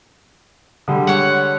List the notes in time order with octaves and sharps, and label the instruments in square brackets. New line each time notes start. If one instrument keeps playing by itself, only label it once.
[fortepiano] D3 G3 G#3
[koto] C#5 F#5